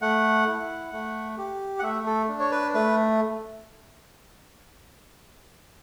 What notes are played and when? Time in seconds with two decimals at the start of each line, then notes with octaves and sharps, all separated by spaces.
0.01 A3 F#5
0.47 E4
0.93 A3
1.38 G4
1.79 F#5
1.83 A3 E5
2.06 A4
2.29 D4
2.40 C#5
2.52 B4
2.74 A3 B4